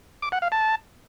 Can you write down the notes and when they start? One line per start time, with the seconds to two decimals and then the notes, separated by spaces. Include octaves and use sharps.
0.22 D6
0.32 F#5
0.42 F5
0.52 A5